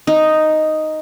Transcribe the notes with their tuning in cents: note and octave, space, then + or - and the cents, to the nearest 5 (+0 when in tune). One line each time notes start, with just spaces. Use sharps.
D#4 +0